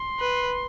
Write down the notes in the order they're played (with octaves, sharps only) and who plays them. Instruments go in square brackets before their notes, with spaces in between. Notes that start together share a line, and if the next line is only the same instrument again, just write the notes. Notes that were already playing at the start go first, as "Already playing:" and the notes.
Already playing: [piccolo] C6
[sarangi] B4